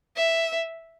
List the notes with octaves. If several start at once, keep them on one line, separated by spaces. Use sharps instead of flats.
E5